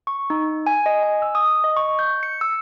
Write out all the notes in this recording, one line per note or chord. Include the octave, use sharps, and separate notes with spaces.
C#6
D#4
G#5
D#5
G#5
E6
D#6
D#5
C#6
G6
C#7
E6